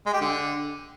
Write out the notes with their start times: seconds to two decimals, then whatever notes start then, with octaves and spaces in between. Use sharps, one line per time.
0.06 G#3
0.14 G4
0.21 D3